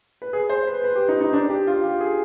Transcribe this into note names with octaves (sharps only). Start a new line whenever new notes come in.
B4
G#4
C5
B4
B4
G4
D#4
D#4
D4
G4
F4
G4
G#4